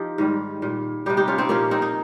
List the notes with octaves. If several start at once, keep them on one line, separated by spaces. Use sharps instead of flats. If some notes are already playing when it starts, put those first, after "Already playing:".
Already playing: F3 D#4 G4
G#2 D#3 G3
A#2 G3
C3 G3 D#4 G4
D#4 G4
C#4 F4
C4 D#4
A#2 F3 A#3 C#4
C4 D#4
D#4